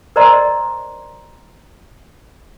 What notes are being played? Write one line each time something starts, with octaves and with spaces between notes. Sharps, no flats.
A#4 C5 D5 D#5 A#5 C6